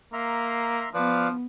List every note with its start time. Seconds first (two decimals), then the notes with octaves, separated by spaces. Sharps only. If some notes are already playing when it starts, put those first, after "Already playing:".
0.13 A#3 E5 A#5 C6
0.94 F3 B3 B4 D5 F5